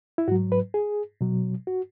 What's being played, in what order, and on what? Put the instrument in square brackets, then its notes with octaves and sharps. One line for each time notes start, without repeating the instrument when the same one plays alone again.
[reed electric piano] E4
G#2 F#3 F#4
B4
G#4
B2 F#3
F#4